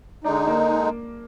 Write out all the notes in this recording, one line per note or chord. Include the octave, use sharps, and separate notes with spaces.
D3 G#3 D4 D#4
A#3